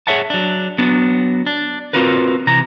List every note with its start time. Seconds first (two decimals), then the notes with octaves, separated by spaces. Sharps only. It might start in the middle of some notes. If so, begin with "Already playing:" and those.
0.07 G#4 C5 C#5 E5 F#5 A5
0.30 F#3 D4
0.78 F#3 B3 D4
1.46 D4
1.93 C4 F4 F#4 A#4 B4
2.47 C3 E3 A#5